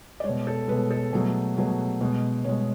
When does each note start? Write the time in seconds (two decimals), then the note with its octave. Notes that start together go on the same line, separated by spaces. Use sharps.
0.20 D5
0.24 G#3 C#5
0.29 B2
0.47 A4
0.68 B2 G#3 B4
0.91 A4
1.13 B2 F#3 A3 G#4
1.57 B2 F#3 A3 G#4
2.01 B2 G#3
2.44 B2 G#3 C#5